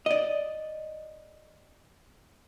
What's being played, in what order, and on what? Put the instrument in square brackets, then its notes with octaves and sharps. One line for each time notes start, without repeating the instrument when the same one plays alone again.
[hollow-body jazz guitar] D5 D#5